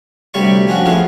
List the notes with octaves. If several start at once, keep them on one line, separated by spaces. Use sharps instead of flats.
D2 C3 G3 C#5 D5 C#6
F3 C#4 D4 F#4
F3 A3 B3 F4 G#4